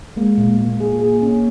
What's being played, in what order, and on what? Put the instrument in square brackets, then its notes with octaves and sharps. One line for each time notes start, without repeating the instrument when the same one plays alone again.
[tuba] G#3 [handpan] A#3
[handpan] A#2
[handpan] A#2 [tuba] A#3
[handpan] G#4
G#4
C#4